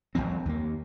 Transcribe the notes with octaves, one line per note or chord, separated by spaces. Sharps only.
G1 F#2 F3 C4
D#2 A#3